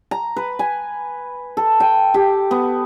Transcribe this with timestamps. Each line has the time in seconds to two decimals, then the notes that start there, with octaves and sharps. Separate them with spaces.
0.11 A#5
0.36 B4
0.59 G#5
1.57 A4
1.80 G5
2.14 G4
2.51 B3